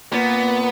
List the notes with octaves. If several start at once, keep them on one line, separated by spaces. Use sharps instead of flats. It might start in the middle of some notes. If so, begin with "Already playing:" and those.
A#2 B3